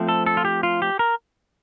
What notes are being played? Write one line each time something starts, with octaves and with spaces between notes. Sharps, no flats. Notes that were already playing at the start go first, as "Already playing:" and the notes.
Already playing: F3 A3 C4
A4
A4
F4
G4
F4
G4
A#4